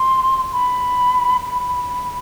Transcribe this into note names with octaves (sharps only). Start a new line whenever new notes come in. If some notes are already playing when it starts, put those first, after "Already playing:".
Already playing: C6
B5
B5